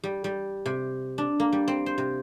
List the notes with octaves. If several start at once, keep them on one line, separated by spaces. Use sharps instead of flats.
G3
G3
C3
D4
A#3
G3
C4
C5
C3